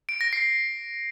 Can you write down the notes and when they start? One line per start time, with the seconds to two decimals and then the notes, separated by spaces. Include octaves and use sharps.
0.09 D7
0.21 A#6
0.33 C7